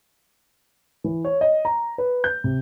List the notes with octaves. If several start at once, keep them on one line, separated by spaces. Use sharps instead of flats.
E3
C#5
D#5
A#5
B4
G6
C3